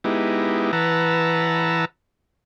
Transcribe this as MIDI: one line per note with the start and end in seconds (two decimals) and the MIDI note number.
0.04 0.72 56
0.04 0.72 59
0.04 0.72 63
0.04 0.72 64
0.04 0.72 67
0.73 1.85 52
0.73 1.85 71
0.73 1.85 78
0.73 1.85 81
0.73 1.85 82
0.73 1.85 88